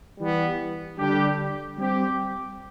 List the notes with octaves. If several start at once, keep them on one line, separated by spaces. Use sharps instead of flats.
E3 G3 B3
D3 G3 D4 G4
G3 C4 G4